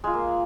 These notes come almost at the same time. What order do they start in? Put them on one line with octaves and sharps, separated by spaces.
G#3 F4 C5 A#3